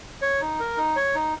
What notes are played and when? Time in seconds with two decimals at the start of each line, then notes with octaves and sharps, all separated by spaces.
0.22 C#5
0.41 D#4
0.60 A#4
0.77 D#4
0.96 C#5
1.15 D#4